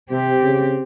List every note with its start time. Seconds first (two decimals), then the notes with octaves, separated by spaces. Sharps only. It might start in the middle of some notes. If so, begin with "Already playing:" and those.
0.11 C3 C4 G4
0.43 C#3